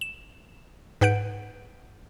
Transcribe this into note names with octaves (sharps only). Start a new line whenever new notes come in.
E7
G#2 B4 F#5 G6 D7